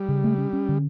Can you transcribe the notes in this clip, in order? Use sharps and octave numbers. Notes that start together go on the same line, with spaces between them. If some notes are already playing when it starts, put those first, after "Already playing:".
Already playing: G3
C#3
A3
C#4
C#4
D3